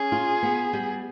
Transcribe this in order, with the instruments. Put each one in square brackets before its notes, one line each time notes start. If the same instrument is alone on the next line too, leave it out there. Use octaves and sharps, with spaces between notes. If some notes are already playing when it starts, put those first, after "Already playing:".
Already playing: [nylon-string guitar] C#4 [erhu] G#4
[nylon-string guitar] F4
B3
G3